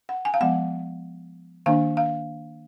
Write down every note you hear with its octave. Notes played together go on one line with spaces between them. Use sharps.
F#5
G#5
F5
F3 G#3 B3 F#5
D#3 A#3 D4 F5
F5